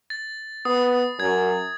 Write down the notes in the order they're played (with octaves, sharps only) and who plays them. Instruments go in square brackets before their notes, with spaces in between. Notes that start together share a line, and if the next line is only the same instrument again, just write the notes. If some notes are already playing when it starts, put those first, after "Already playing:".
[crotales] A6
[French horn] B3 [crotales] D#6
[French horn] F#2 [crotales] G#6